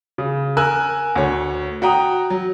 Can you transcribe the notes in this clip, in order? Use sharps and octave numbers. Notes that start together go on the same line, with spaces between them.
C#3
A#4 G#5 E6 F#6
D2 C#5
F#4 G5 A#5 D#6
F#3